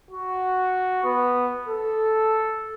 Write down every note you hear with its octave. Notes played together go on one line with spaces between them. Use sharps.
F#4
B3
A4